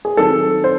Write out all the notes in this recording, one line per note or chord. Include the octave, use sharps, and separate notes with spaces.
G#4
D#3 F#3 C4 A4
C5